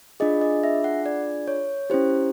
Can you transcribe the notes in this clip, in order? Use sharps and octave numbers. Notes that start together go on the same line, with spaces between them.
D4 F4 G#4 D#5
D#5
E5
F#5
D5
C#5
C#4 E4 G4 C5